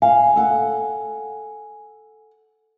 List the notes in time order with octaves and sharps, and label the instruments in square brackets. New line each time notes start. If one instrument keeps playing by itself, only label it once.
[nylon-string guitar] F5 [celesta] G#5
[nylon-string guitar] A4 F#5